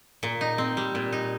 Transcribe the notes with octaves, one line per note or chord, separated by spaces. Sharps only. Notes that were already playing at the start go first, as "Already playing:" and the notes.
A#2
D#4
C4
G3
A#2
D#4